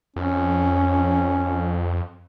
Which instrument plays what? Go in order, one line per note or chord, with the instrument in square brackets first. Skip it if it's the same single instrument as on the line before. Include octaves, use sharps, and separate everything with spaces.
[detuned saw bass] F2 [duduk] C#4